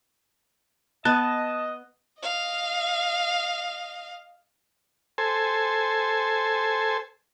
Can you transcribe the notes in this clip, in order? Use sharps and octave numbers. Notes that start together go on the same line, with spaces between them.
B3 D#5 A5 F#6
D#5 F5
A4 C5 G#5